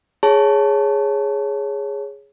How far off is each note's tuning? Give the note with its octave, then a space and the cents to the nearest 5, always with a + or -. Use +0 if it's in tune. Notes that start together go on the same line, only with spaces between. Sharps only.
G#4 +0 C#5 +0 A5 +0